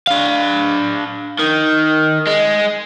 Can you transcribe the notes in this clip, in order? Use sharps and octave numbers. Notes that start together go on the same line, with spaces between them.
D4 F5
D#3
G#3